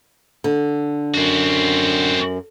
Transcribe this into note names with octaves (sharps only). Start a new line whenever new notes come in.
D3
F#2 C4 F#4